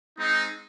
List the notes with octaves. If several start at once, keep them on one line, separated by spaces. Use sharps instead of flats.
G#3 C4 D#4